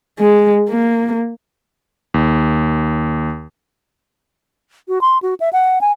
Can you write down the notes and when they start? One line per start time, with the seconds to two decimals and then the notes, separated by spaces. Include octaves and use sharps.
0.19 G#3
0.69 A#3
2.14 D#2
4.88 F#4
5.01 C6
5.22 F#4
5.40 E5
5.53 F#5
5.81 G#5